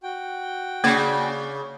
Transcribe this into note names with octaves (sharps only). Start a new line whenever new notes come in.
F#4 G5
C#3 A#3 D5